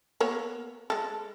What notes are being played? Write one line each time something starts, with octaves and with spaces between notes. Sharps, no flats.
A#3 B3 C#5
G#3 A4